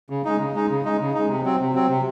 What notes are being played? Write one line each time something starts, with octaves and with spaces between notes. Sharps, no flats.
C#3
G#3 D#4
C#3
G#3 D#4
C#3
G#3 D#4
C#3
G#3 D#4
C3
F#3 C4
C3
F#3 C4
C3